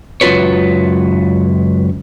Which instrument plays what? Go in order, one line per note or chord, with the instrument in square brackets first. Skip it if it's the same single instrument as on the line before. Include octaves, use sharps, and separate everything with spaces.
[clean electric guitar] C#2 F#2 F4 F#4 B4 C#5